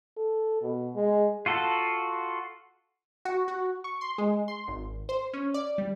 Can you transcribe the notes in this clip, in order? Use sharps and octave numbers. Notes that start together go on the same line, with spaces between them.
A4
B2
G#3
F4 F#4 A4
F#4
F#4
C#6
C6
G#3
C6
G#1
C5
C#4
D5
G3